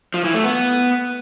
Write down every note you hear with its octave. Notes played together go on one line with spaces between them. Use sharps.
F3
E3
A3
B3